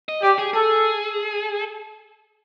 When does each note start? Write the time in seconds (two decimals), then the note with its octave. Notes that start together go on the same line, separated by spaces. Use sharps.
0.09 D#5
0.23 G4 D5
0.38 G#4
0.53 G#4 A4